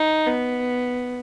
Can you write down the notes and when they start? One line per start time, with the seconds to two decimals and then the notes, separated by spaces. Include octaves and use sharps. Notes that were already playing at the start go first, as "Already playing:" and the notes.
Already playing: D#4
0.26 B3